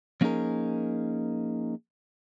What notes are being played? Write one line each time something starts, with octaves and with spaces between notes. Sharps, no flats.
F3 A#3 C#4 D#4 G#4 A#4